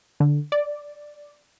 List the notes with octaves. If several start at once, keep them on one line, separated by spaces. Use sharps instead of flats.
D3
D5